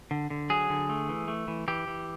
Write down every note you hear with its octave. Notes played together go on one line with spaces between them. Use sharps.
D3
D3
F#3 G#4
D3
A3
E3
A3
E3
E3 G4
E3